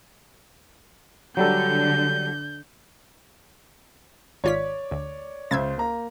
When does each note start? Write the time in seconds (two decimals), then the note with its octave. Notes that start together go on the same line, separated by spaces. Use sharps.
1.37 D3 F#3 G3 A4 G6
4.44 G#1 F4 C#5 D5 B6
4.91 D2
5.51 C#2 C5 E5 G#6 A6
5.77 A#3 A#5